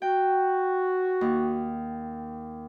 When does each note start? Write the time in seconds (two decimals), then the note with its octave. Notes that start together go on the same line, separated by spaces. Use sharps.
0.02 F#4 G5
1.21 D#2